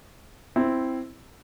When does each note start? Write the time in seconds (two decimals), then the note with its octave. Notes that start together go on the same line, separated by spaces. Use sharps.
0.56 C4 E4